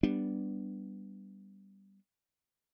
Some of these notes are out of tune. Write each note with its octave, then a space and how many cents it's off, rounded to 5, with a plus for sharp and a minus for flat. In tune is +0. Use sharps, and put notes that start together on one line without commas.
G3 +0 B3 +0 D4 +0